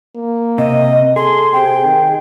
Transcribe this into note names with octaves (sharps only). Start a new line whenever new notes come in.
A#3
C3 D#5
G#4 A4 C6
C3 G5
D#3